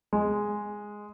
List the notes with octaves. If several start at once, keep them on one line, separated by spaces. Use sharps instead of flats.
G#3